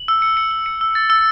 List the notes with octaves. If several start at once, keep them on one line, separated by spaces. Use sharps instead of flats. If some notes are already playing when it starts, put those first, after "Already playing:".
Already playing: F#7
E6
C#7
C#7
E6
C#7
E6
A6
E6